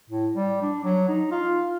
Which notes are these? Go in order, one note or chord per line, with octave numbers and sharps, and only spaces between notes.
A2
G3
D4
F#3
D#4
F4